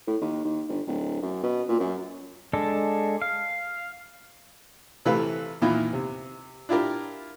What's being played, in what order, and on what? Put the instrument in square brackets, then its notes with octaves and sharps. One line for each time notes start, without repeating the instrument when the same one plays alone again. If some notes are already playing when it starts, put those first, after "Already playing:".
[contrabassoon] A2
D#2
D#2
G1
D1
F#2
B2
A#2
F#2
[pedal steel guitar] G#3 D4 A4
F5
[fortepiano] C3 E3 A3 B4 F5
A#2 D#3 E3 B3 E4 F4
C3
D4 E4 F4 G4 A#4